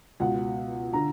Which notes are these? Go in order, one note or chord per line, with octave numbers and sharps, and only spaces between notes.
C#2 B2 F#5
D3 A#5